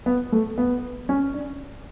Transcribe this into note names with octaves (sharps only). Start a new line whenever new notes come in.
B3
A3
B3
C#4
D4